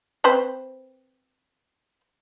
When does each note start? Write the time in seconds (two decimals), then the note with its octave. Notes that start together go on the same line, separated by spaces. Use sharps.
0.24 C4 B4 C5